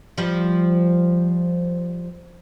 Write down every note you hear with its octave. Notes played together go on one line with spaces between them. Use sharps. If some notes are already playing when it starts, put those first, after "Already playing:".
F3 G3